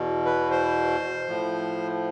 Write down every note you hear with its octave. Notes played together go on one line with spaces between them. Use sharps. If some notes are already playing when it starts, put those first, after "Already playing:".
Already playing: E2 B2
B4
C5
A2 F3